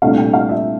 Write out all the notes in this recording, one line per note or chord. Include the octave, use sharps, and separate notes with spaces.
C2 A#2 A3 D4 F5
G5
F5
E5